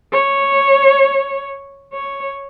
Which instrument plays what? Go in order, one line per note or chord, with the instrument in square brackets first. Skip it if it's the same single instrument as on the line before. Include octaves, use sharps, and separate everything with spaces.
[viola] C#5
C#5